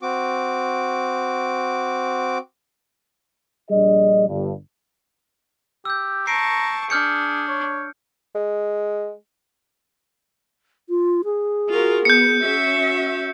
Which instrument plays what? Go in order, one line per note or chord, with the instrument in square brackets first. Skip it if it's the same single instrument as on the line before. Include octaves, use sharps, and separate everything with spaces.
[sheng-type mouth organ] C4 F#4 D6
[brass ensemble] A#1 G3 D4 G#4 D5 D#5
G1 G2
[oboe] G4 [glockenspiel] E6 G6
[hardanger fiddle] A5 C#6 [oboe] A#5 [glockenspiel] C7 D7
[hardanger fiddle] D4 [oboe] G#4 [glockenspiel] F6 G6 C#7
[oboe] C#5
[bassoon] G#3
[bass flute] F4
G#4
[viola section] F4 F#4 A#4
[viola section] B3 [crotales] G6 C#7
[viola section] C#4 F#4 E5